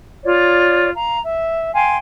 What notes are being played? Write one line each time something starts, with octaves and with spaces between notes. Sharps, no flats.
F4 C#5 D5
F5 A#5
E5
F5 G5 G#5 C6